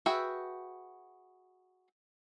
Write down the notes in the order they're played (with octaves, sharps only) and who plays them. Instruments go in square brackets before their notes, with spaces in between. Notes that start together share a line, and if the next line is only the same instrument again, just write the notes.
[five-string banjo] F#4 G#4 B4 E5 G5